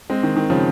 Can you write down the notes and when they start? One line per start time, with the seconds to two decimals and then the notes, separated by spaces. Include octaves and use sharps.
0.10 G#3 C4
0.23 D#3
0.37 D#3
0.50 C#3 F3